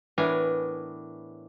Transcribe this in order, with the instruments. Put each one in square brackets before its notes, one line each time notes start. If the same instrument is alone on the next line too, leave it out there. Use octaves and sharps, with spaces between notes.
[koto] A2 E3 B3 D4 A#4 G#5